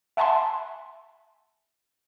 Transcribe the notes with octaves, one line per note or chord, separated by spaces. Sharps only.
E5 F#5 G#5 A5 B5 C6